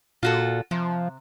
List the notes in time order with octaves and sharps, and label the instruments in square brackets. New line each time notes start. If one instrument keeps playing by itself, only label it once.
[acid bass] A#2 [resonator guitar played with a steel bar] F4 F#4 A4
[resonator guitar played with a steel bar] C3 [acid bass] F3